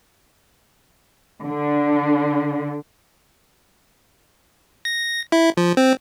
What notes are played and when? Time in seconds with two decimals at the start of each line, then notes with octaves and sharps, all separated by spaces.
1.45 D3
4.85 A#6
5.32 E4
5.57 F3
5.77 C4